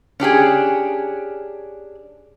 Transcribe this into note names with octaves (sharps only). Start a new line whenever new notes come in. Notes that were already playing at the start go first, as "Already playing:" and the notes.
C#4 D4 G4 G#4